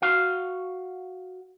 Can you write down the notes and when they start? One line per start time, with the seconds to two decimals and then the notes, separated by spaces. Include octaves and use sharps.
0.02 F#4 F5